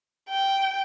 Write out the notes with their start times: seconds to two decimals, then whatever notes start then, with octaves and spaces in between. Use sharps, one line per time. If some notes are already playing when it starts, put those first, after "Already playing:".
0.29 G5